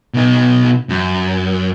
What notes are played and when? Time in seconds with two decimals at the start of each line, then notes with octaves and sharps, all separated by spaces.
0.14 B2 D#4
0.89 F#2